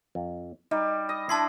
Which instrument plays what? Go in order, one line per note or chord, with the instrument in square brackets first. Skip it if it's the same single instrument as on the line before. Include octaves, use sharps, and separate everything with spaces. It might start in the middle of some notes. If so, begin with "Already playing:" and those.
[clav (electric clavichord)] F2
[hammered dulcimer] G3 [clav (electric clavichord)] D#4
[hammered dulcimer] D#5
[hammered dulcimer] D4 E4 [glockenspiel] A5 C6 C7